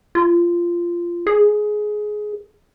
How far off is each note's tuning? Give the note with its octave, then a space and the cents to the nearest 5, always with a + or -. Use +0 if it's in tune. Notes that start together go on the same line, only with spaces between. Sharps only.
F4 -15
G#4 +15